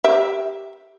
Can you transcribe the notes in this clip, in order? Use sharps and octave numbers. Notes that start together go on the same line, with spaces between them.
G4 E5